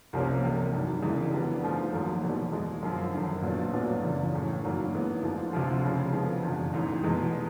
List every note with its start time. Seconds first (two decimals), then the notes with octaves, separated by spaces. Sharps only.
0.13 C2 C3 F3 A#3 C#4
0.42 E1 E2 C3
0.72 G2 D#3 F#3
1.02 E1 E2 C#3 E3 G#3
1.33 F2 D3 G3 B3
1.63 G#2 F3 A3
1.92 G#1 G#2 D#3 F#3 A#3
2.23 E1 E2 B2 G3
2.52 D#2 D#3 G#3
2.83 F#2 D3 F3
3.13 G#1 F#2 D3
3.42 A#1 A#2 F#3 B3
3.73 A#1 A2 F#3 B3 D4
4.03 F#1 E2 C#3 E3
4.33 A1 A2 E3
4.63 G2 D#3 F#3 A#3
4.92 G#2 E3 G#3 B3
5.23 D2 D3 F3
5.53 D2 C3 F3
5.83 F1 F2 C#3
6.13 F2 D3 F3 G#3 B3
6.43 F#1 E2 B2
6.74 A1 G#2 E3
7.03 F1 E2 B2 G#3 B3